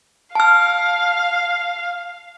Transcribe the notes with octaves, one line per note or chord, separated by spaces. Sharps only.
F5 A5 F6